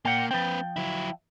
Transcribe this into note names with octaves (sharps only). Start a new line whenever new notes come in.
A#2 A#3 F#5 G5
F3 C4 B4 G5
F#3 E4